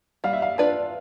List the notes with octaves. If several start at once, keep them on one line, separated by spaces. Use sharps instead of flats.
G3 F5
E5
F5
D4 F4 B4 D5